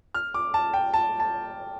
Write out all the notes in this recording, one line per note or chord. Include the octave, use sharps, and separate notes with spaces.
F6
D6
A5
G5
A5
A5